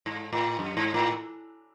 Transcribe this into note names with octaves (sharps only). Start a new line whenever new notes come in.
G#2
A2
F#2
G#2
A2